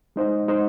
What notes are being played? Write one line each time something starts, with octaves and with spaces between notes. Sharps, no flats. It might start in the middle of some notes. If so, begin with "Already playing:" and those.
G#3 D#4 C5 D#5
G#3 D#4 C5 D#5